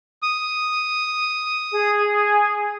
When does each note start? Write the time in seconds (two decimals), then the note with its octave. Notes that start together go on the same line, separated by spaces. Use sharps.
0.22 D#6
1.72 G#4